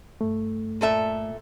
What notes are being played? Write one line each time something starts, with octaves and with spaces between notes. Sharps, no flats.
G2 A3
A#2 A4 E5